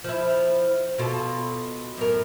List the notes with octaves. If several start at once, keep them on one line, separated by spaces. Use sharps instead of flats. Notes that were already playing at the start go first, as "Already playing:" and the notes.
F3 E4
B2 F4 A4
F#2 A2 A#4